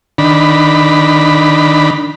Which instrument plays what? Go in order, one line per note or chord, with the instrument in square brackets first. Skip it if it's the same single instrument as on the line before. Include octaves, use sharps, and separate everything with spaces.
[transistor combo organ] D#3 D4 B5